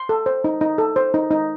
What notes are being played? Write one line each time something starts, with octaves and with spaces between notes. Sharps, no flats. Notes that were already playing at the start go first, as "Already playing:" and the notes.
Already playing: C6
A4
C5
D#4
D#4
A4
C5
D#4
D#4